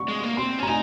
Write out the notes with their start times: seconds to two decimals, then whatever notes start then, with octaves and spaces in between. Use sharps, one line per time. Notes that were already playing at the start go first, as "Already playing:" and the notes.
Already playing: C#6
0.08 G#3
0.23 A#3
0.37 C4 C6
0.59 C#4
0.63 A#5
0.67 D#4 G#5